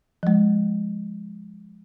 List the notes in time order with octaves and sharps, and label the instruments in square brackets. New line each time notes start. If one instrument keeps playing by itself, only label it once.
[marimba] F3 G#3